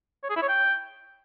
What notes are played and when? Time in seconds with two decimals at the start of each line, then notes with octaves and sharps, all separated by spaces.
0.23 C#5
0.30 G#4
0.36 E4
0.42 C#5
0.48 G5